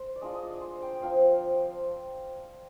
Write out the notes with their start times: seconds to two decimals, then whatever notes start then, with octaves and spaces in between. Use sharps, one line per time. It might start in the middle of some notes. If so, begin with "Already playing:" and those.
Already playing: C5
0.16 D5
0.21 G#3 D4 F4 D#5
0.35 D#5
0.42 D5
0.61 C5
0.82 G5
1.02 F3 C4 F4 F5
1.22 F5